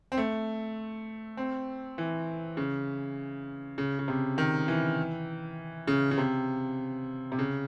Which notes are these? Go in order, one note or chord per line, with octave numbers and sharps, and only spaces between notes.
C4
A3
C4
E3
C#3
C#3
C#3
C3
D#3
E3
C#3
C#3
C3
C3
C#3